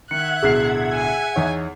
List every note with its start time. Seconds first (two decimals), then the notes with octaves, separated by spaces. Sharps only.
0.11 D#3 E5 F#5 F#6 G#6 C#7
0.43 D1 B2 G#4 C7
0.94 G#5
1.36 E2 D#4 C#5